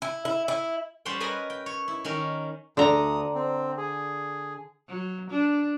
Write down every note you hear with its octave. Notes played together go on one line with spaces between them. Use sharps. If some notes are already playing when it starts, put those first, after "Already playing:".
E4
E4
E4
G3 C#4 C5 F#5 G5
A#4 B4 D#5 G#5 A#5 B5
G5
C#5
E4
D#3 C#4 A#4
D2 D3 A#5 D#6
C4
G#4
F#3
D4